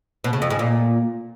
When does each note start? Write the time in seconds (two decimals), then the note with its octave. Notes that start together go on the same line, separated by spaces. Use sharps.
0.24 B2
0.33 C#3
0.42 F2
0.50 G#2
0.59 A#2